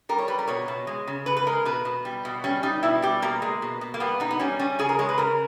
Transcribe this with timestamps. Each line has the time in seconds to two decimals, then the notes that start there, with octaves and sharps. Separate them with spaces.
0.09 G3 A#4
0.18 C#5
0.28 G3 B4
0.39 A#4
0.47 B2 C#5
0.68 B2
0.87 G#3
1.07 C#3
1.26 C#3 B4
1.37 B4
1.47 G#3 A#4
1.65 B2 B4
1.85 B2
2.05 G3
2.25 B2
2.44 G3 C#4
2.63 G3 D#4
2.83 B2 E4
3.02 G3 G4
3.22 B2 A#3
3.42 G#3
3.62 B2
3.81 B2
3.94 A#3
4.00 G3 B3
4.20 B2 D#4
4.31 B3
4.39 G3 C#4
4.59 G3 C#4
4.79 C#3 G#4
4.89 A#4
4.99 G#3 C#5
5.09 B4
5.18 C#3 A#4